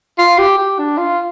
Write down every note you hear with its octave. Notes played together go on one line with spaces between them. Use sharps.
F4
G4
G4
D4
F4